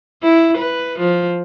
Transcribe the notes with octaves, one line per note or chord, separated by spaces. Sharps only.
E4
B4
F3